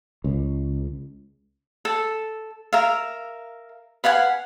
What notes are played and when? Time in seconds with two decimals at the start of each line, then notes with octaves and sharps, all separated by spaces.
0.24 C#2
1.85 A4
2.73 A#4 E5 F5
4.04 B4 F5 F#5 G#5